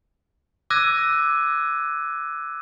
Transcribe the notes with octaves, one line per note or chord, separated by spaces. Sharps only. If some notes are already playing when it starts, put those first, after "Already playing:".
D6 E6 F#6 G#6 A#6 D#7